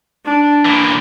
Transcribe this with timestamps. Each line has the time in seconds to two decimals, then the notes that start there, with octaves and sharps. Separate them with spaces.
0.25 D4
0.65 A#2 E3